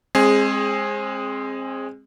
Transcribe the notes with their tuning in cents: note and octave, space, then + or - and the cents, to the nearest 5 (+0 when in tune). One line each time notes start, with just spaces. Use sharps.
G#3 -10 C4 +30 G#4 +0